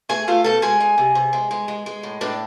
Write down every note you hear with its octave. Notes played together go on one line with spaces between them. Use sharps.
A3 G#4 G#5
A3 F4 F5
B2 A4 A5
G#3 G#4 G#5
G#3
C3
C3
G#3
G#3
G#3
G#3
A2
A2 D4 D5